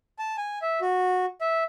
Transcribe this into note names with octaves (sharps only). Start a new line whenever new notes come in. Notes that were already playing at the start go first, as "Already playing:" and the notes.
A5
G#5
E5
F#4
E5